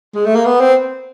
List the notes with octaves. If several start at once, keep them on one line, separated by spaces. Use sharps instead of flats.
G#3
A3
A#3
B3
C4